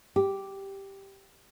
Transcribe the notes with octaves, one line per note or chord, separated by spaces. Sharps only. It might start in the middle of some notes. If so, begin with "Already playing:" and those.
G4